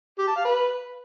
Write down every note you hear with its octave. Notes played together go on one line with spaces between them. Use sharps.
G4
A5
F5
B4